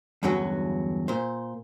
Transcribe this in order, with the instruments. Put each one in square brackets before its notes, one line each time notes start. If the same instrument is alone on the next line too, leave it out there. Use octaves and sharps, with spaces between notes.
[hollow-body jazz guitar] E2 G2 D3 F#3 C#4 F#4
A#2 C5